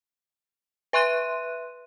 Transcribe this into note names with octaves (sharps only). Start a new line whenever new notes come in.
B4 E5 C6 F#6 D#7